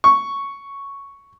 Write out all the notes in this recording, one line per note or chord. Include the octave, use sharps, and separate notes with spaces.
C#6